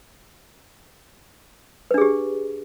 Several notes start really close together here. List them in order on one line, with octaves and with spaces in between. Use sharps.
B4 D4 G#4 G4